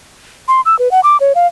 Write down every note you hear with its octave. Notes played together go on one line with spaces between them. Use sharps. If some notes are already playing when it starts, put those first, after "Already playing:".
C6
E6
B4
F#5
D6
C#5
F5